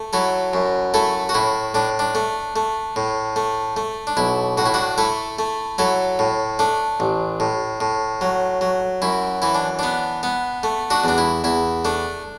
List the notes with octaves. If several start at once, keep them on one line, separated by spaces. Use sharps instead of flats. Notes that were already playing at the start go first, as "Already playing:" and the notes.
Already playing: A3
F#3 E4 A4
F#2
A3 E4 A4
F#4
A2 E4
A2 D4
D4
A3
A3
A2
A3
A3
D4
B1 E4
A2 F#4
E4
D4 F#4
A3 E4 A4
A3
F#3 E4 A4
A2
A3 D4
A1
A2
A2
F#3
F#3
F#2 E4
E3 E4
D4
B3 D4
B3
A3
D4 F#4
E2 D4
E4
E2 E4
A3 D4